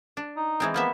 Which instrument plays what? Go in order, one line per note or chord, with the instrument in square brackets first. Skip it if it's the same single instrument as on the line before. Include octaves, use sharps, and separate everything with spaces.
[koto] D4
[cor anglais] D#4
[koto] E3 G#3 C4
[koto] F3 A#3 E5 [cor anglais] B3